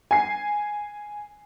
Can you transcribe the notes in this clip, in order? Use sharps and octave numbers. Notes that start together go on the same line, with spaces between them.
G#5 C7